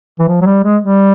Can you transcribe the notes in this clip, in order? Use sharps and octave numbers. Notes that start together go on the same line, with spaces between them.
E3
F3
F#3
G3
G#3
G3